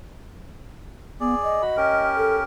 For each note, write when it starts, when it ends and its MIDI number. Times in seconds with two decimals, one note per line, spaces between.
1.20 1.35 59
1.20 1.62 68
1.20 1.62 74
1.43 2.05 75
1.62 1.77 66
1.62 1.77 83
1.77 2.44 61
1.77 2.44 67
1.77 2.44 70
2.17 2.37 69